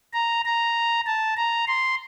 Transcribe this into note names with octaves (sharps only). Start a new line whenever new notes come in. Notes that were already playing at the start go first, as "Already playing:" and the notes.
A#5
A#5
A5
A#5
C6